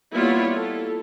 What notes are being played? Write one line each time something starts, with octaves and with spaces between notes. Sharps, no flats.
G3 A#3 B3 E4 F4 C#5
A4